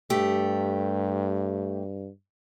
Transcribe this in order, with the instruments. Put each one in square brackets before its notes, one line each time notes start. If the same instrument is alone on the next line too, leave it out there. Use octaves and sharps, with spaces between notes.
[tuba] G2 [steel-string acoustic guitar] A3 G4